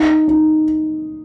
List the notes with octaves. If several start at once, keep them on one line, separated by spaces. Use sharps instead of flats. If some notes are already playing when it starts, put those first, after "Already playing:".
Already playing: D#4
D#4